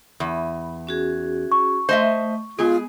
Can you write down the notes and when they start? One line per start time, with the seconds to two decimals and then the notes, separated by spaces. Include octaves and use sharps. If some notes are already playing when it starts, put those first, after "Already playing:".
0.20 E2 B5
0.87 C#4 F#4 G#4
1.52 C#6
1.89 A3 C5 D#5 E5
2.59 G#3 B3 F4 G#4